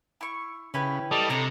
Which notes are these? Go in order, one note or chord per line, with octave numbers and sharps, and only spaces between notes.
E4 C#6
C#3 E4 G4 B4
G3 A4 D5 D#5
C3 D4 A4 C#5 A#5